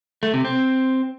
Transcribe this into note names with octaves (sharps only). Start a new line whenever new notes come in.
A3
C3
C4